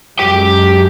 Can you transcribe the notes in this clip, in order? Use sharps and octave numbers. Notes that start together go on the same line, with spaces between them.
F#2 F#3 G#3 G4 G5